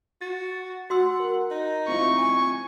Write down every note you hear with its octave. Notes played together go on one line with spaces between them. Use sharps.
F#4 A6
F#4 F#5 C6 E6
A#4
D#4
C4 E4 F4 C#6
G#5